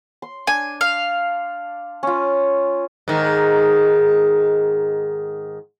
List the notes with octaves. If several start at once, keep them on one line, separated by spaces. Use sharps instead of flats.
C6
D4 G#5
F5
C#4 F4
G#2 D#3